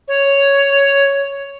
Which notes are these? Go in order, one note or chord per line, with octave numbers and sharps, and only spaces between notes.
C#5